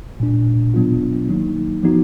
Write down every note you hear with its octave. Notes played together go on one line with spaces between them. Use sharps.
A#2 G#3 D4
B2 F#3 B3 D4 F4
D#3 F#3 A#3 D#4
F3 B3 D#4 F#4